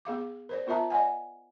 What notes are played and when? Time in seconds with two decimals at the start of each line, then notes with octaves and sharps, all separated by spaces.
0.05 B3 G#4 F5 D6
0.49 A#4 C5 D5
0.67 B3 F4 A#4 E5 A5 A#5
0.90 D5 D#5 F#5 G#5